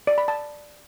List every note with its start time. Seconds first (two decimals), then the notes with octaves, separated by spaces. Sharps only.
0.07 D5
0.18 B5
0.28 A5